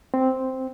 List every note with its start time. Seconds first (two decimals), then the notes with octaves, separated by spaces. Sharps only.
0.14 C4